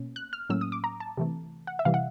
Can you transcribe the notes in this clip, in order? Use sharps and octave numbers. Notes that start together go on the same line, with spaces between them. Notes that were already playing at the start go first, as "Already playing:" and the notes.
Already playing: B2 A#3 C#4
F#6
F6
A2 F#3 A#3 C#4 E6
D#6
D6
A#5
A5
C3 E3 A3
F#5
E5
C3 E3 G3 F5
F#5